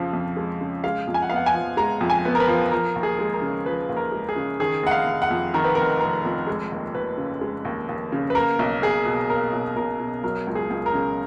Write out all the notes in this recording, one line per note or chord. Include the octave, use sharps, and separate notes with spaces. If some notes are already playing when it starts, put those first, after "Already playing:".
Already playing: F2 C#3 F3
F2
G#3
C#3
G#3 F5
F2
G#5
F#5
B3 F5
F#5
G#5
F3
G#3 A#5
F2
G#5
B3
A#4
B4
F3
F3 A#4
D#2
G#4
G#3
A#4
C#3
F3 B4
D#2
A#4
G#3
G#4
C#3
D#3 G#4
F1 F#5
F5
F1
F#5
F2
D#3 A#4
B4
F1 A#4
F1 A#4
F2
G#3
D#2
D#2 B4
C#3
G#3
D#2
D#2
C#3
B4
A#3 A#4
B1
B1 G#4
B2
A#3 A#4
B1
B1 A#4
B2
F#3 A#4
C#2
G#4
C#2
A#4
C#3